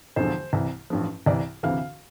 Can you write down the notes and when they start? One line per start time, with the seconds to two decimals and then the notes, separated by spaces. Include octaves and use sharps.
0.16 E1 E2 D3 F3 C5
0.53 C2 C3 E3
0.90 A1 G2 F3
1.26 C2 C3 E3 D5
1.63 D2 C3 E3 F5